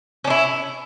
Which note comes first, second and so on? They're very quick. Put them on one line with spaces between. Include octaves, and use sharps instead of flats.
C#4 D4 E4